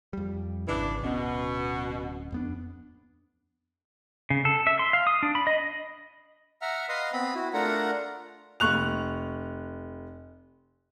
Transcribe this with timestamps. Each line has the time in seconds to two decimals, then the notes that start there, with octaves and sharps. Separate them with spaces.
0.13 F2 G3
0.67 G#1 C#3 E3 D4
1.03 D1 B2 C#4
2.32 F2 B3 D4
4.30 C#3
4.45 A4
4.67 E5
4.79 C6
4.93 F5
5.07 D#6
5.23 D4
5.35 B5
5.47 D#5
6.62 E5 F#5 A#5 F6
6.89 B4 D#5 F5 C6 D#6 F6
7.13 B3 C4 B5
7.35 E4 F#4
7.54 A3 D4 F4 A#4 F#5 A#5
8.60 F1 C#6 F#6 F7